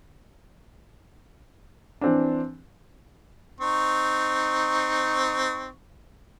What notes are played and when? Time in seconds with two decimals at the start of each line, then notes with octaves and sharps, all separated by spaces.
2.01 E3 C4 D4
3.61 C4 D#4 C#6